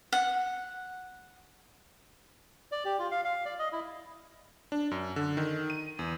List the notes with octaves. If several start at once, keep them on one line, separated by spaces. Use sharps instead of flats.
F#5
D5
G4
F4
F5
F5
D5
D#5
E4
D4
F#2
D3
D#3
D#7
E2